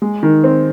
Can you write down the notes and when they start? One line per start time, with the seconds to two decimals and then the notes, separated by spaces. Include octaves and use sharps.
0.02 G#3
0.23 D#3
0.44 C4